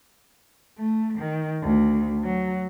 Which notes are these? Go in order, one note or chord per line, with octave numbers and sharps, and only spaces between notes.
A3
D#3
D2
F#3